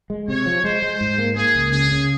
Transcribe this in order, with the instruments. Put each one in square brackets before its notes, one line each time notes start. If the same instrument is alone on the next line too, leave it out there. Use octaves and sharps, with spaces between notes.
[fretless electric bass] G#3
[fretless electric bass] C3 [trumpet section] C#5
[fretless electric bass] F3
[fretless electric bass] G#3 [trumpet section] C5
[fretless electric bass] G#3
G#2
A#3
[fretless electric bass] A#3 [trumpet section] G#4
[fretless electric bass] C#2
[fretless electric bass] C#3 [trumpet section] G#4
[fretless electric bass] C#3